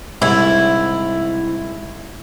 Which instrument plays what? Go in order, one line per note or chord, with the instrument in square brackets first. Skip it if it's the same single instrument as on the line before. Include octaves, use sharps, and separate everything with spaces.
[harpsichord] C2 G#2 [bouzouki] E4